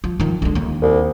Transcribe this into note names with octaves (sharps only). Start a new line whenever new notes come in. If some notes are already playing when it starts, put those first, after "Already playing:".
F3
D#3 F3
D3 G#3
D#2
C2